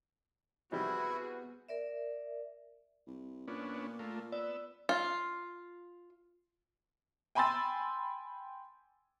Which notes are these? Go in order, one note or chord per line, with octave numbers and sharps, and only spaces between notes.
C3 E3 G3 B3 E4 F#4 G#4
A#4 D5 E5
C2
A#2 B3 C#4 D4
A3 A#3 F4
B3 D5 E6
F4
G5 G#5 B5 C6 E6 A6